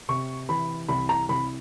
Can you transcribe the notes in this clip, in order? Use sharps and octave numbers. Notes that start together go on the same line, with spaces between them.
C3 C#6
E3 B5
C2 B5
A#5
C2 B5